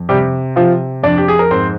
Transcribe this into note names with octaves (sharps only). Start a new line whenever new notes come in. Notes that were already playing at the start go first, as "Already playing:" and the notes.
Already playing: F2
C3 G3 G4
C3 F3 F4
F2 D4 D5
G4
G#4
A#4
G#2 C4 C5